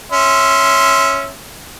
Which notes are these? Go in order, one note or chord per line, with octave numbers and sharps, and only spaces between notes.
C#4 E5 C6